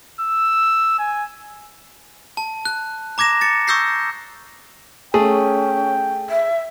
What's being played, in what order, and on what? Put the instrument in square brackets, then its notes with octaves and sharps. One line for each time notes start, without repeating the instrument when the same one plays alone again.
[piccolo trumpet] E6
G#5
[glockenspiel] A5
F#6
A#5 D6 G#6 A#6 E7
A6 C#7
C#6 D#6 E6 G6 A#6 C7
[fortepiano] A3 [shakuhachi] C#4 [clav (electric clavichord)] G#4 [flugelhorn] G5
[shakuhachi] E5